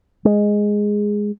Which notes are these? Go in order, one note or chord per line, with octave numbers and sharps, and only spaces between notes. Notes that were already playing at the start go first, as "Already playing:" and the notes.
G#3